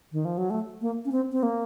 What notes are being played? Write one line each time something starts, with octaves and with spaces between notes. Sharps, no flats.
D#3
F3
F#3
A3
A#3
C#4
C4
C4
A#3